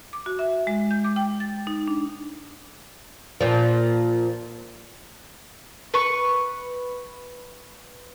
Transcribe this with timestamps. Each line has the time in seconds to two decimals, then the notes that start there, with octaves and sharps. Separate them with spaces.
0.13 D6
0.26 F#4
0.39 E5
0.67 G#3
0.91 G6
1.04 D6
1.16 G5
1.40 A6
1.67 D#4
1.88 D4
3.41 A#2 F3
5.94 B4 C#6